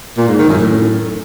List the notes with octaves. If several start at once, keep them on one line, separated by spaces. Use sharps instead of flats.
A#2
G#2
D#3
F#2
A2